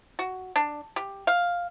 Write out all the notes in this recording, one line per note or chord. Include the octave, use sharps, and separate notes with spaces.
F#4
D4
G4
F5